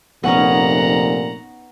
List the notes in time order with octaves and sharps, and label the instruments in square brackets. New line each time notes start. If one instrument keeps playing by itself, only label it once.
[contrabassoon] F1 [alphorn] A#2 [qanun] B3 C#4 D#4 [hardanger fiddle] F#5 A#5